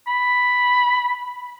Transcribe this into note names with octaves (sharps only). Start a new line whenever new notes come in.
B5